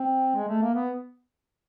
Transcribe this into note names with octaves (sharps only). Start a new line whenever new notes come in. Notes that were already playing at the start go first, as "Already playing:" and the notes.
Already playing: C4
G#3
A3
A#3
B3